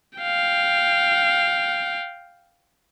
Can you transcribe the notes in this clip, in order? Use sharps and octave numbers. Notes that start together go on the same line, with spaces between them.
F5 G5